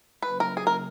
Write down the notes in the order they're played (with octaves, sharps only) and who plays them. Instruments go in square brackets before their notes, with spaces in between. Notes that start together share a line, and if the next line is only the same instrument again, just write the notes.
[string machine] C#3 F#3 A#3 C#4 [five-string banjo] B4
[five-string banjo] A#4
G#4
A#4